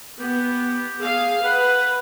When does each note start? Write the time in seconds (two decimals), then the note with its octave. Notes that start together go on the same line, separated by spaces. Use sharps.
0.20 B3 G4
1.00 G#4 F5
1.45 B4 F#5